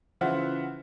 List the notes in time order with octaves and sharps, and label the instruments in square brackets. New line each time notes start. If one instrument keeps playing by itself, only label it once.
[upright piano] C#3 E3 F4 C5 E5 F#5